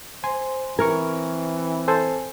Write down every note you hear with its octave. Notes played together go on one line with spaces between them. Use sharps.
C5 G#5 C6
E3 C4 A#4 C#6 F6 G#6
A4 C5 G#5